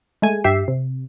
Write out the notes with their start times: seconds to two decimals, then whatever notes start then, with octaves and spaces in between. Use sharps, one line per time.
0.22 G#3 A3 G#5
0.44 G2 G4 E5 C7
0.68 C3